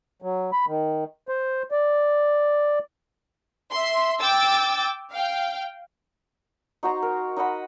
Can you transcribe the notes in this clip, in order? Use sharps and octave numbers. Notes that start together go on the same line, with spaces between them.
F#3
B5
D#3
C5
D5
E5 C6
G5 D6 E6 A6
F5 G5
D#4 F#4 C5 A#5
A#4
D#4 D#5 F#5 B5